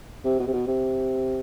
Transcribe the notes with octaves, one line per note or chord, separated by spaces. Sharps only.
C3
B2
C3
B2
C3